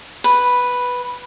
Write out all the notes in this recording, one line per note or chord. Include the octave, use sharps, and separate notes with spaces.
B4